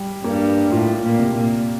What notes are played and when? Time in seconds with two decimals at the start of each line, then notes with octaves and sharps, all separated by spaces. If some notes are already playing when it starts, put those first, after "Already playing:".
Already playing: G3
0.24 G2 A#3
0.72 A2 F4
1.03 A#2
1.19 C3
1.34 A#2